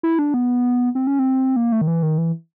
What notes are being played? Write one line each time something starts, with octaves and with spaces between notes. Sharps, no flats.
E4
D4
B3
C4
C#4
C4
A#3
A3
D#3
E3
D#3
E3